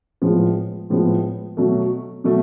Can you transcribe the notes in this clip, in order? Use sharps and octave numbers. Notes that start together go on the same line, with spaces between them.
A2 F3 G#3 B3
A2 F3 G#3 B3
B2 F#3 A3
B2 F#3 A3